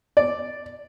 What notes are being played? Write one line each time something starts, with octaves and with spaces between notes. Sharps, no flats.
D5